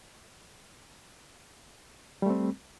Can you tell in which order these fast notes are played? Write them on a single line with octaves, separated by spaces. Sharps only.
G3 A3 C4